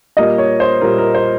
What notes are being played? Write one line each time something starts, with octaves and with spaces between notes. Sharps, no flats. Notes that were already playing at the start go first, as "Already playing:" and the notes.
A#2 G3 A#3 D#5
C#5
C5
A#2 G3 A#3 A#4
A#4
C5